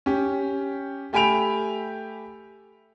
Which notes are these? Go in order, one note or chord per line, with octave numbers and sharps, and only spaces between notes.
C#4 G4
A3 G4 G#5 B5 D7 F7